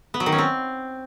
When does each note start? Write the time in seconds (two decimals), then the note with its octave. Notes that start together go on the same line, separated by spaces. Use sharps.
0.14 B3
0.20 F#3
0.26 D#3
0.32 C#4
0.38 C4